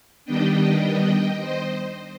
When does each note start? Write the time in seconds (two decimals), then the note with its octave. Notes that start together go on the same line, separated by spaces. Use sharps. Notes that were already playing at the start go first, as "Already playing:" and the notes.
0.25 D#3 G3 B3 D4 D#5 G5
1.39 C5 D#5